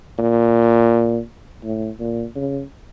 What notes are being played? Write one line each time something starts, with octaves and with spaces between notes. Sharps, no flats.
A#2
A2
A#2
C#3